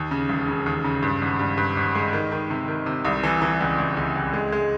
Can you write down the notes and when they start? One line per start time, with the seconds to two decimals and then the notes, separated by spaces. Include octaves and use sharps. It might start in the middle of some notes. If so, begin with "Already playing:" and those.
Already playing: D#2
0.11 C#3
0.29 E1
0.48 C#3
0.66 D#2
0.84 C#3
1.02 G2
1.22 G#1
1.39 G2
1.57 G2
1.77 G#1
1.95 G#3
2.13 D#3
2.32 D#3
2.50 C3
2.68 D#3
2.86 C3
3.05 C2
3.23 E3
3.42 E3
3.60 C#2
3.78 C#2
3.97 C#2
4.16 C#2
4.33 G#3
4.52 G#3